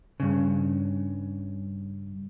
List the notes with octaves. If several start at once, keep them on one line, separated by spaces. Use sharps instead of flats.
G2 C#3